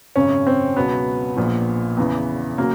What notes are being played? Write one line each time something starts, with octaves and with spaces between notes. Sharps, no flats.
G#1 F#2 C#3 C#4
C4
C#2 B2 F#3 B3
A#1 A#2 F3
E2 C#3 E3
C#3 F#3 A#3